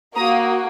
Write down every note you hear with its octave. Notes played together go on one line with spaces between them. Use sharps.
A#3 F#4 A#5 D#6